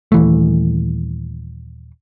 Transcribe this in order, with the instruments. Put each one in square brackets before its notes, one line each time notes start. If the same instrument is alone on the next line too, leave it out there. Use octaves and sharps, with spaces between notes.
[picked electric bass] D#1 E3 A3